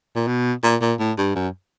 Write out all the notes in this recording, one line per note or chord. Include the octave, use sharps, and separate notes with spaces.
A#2
B2
A#2
A#2
A2
G2
F#2